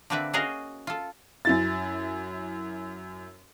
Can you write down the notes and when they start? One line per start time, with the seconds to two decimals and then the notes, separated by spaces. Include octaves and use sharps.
0.10 D3 A#3 C4 B4 D5 E5
0.33 C#4 F#4 G#4 A#4 D#5 F5
0.87 F4 A4
1.45 F#2 E4 A6